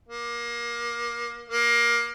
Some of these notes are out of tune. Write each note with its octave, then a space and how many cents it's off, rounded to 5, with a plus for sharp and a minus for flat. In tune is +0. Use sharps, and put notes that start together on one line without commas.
A#3 +25
A#3 +20